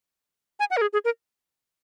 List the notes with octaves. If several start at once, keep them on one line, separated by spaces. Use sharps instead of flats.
G#5
F#5
A#4
G#4
G#4
A#4